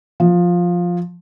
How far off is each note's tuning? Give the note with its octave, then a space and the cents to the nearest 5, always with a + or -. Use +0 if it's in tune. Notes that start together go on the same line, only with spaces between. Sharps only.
F3 +10